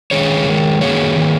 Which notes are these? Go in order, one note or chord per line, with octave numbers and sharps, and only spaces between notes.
D#3 G#3 G#4 C#5
D#3 G#3
D#3 A#3 G#4 C#5
D#3 A#3